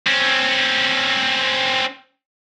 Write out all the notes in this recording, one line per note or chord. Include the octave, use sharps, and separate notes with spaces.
C4 C#4